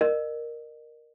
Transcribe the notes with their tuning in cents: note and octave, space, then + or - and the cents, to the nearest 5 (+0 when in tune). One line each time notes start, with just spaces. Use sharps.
A#4 +0 D#5 -35